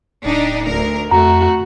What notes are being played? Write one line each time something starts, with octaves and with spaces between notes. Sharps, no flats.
D1 D4 D#4 G4
D2 A#4
F2 A3 F#4 A#5